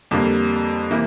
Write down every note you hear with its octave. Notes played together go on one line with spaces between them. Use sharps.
F2 D3 G3 A#3
C3 E3 A#3 E4